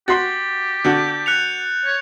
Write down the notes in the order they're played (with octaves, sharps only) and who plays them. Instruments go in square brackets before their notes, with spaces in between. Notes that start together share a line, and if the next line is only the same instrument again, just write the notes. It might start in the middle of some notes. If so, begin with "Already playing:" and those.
[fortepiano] F#4 C6 [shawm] G4 [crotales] A6
[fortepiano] D3 F#4 [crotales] G6
[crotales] F#6 C#7 F7
[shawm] C#5